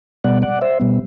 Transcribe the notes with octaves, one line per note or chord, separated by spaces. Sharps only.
B2 G3 B3 D5 F#5
D5 F#5
C5 E5
B2 G3 B3